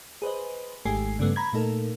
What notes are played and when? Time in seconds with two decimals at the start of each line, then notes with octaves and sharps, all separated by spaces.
0.22 G#4 B4 C5 D#5
0.86 G#1 G#3 A3 G4 G#5 C7
1.19 G2 C#3 G3 A3 B3
1.36 A#5 B5 G#6
1.53 A#2 A3 D#4 A4 A#4